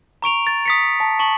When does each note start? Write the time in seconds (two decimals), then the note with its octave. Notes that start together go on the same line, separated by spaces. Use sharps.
0.22 A#5 C#6 D7 F7
0.47 A6
0.66 D#6 B6 C#7
1.00 A5
1.19 A5 C#6 F#7